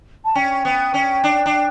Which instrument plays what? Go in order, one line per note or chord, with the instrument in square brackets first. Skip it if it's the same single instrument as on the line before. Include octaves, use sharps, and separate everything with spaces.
[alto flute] A5
[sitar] C#4 [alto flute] G5
[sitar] B3
C#4
D4
D4